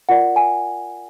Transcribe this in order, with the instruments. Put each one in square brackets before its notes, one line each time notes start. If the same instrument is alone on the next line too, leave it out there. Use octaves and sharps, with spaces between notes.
[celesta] F4 A#4 D5 F#5
G#5